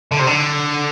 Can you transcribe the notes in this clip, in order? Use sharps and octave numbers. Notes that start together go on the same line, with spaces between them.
D3
C3
D3